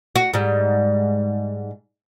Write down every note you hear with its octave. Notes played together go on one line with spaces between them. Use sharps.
F#4
G#2 G3